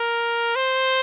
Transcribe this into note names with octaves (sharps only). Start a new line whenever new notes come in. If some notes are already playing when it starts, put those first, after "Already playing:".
Already playing: A#4
C5